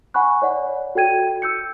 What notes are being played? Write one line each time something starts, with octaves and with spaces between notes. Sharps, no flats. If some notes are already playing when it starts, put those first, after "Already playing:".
F#5 G#5 B5 C#6 F#6
C#5 D5 F#5
F#4 A4 G5 G#6 D#7
E6 G6 C#7